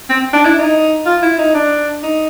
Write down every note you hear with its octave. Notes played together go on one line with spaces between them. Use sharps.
C4
D4
E4
D#4
F4
E4
D#4
D4
D#4